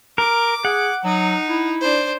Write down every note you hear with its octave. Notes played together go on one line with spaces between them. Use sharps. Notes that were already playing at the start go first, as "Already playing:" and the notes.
A#4 D6
G#4 F#5
F#3 D#4
E4
D4 C5